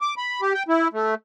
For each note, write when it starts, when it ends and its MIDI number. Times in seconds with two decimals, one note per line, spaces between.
0.01 0.14 86
0.17 0.41 83
0.41 0.53 67
0.54 0.63 79
0.68 0.88 64
0.93 1.15 57